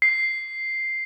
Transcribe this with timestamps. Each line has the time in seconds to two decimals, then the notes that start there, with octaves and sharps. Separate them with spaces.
0.02 C7